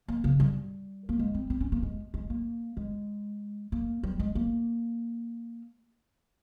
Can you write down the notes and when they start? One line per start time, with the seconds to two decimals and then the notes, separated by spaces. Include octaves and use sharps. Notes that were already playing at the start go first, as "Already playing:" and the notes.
0.08 A#3
0.24 C#3
0.40 G3
1.09 A#3
1.19 G#3
1.34 C4
1.50 C4
1.61 C#4
1.72 A#3
1.82 G#3
2.14 G#3
2.30 A#3
2.77 G#3
3.72 A#3
4.03 G3
4.19 G#3
4.35 A#3